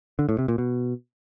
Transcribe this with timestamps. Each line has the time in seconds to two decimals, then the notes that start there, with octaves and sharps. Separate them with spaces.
0.19 D3
0.29 A2
0.39 C3
0.48 A#2
0.58 B2